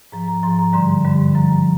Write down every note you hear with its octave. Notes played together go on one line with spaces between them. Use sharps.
G#2 F3 A#5
A#5
G#2 F3 C6
A#5
G2 D3 G3 C6
G2 D3 G3
G2 F3 A#5